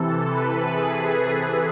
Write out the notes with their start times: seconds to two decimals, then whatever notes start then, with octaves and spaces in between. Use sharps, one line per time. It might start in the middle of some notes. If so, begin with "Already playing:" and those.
Already playing: C3 E3 A4
0.26 B4
0.71 G#4